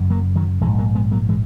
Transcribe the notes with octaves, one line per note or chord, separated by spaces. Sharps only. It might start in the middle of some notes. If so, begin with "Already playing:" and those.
Already playing: F#1 F#2
F#3 A#3
D#3 F#3
A#1 G#2 E3 G#3
F#3 A#3
G#3 B3
F#3 A#3
E3 G#3